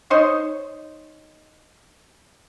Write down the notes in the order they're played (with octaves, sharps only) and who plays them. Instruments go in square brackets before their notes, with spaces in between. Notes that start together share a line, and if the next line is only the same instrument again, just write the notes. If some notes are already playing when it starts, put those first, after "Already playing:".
[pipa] D#4 C5 C#5